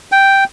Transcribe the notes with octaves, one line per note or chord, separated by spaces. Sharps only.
G5